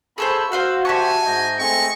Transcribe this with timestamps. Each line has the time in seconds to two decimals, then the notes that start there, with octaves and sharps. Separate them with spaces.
0.18 G#4 A4 C5 B5 C#6 E6
0.52 F#4 C5 F5 F#5
0.85 G4 C5 E5 F#5 G#5 A5 C#6
1.25 G#2 D#5 G6
1.59 G#3 A3 C4 D#5 G#5 C#6